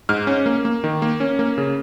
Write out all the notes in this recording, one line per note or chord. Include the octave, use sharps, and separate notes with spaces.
G#2 F6
C#4
A#3
A#3
D#3
A#3
C#4
A#3
C#3